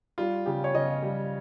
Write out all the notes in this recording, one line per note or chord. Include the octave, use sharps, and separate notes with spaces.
G3 F4
C#3 G4
C#5
C#3 D#5
G3